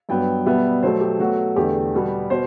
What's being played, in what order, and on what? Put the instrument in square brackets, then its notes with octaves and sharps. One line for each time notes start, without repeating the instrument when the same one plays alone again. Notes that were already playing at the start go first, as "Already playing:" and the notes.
[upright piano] G2 F#3 B3 G5
B2 G3 B3 E5
B2 F#3 A3 C5
G4
B2 F#3 A3 F#4
E2 D3 A3 G4
B2 G3 B3
B2 C5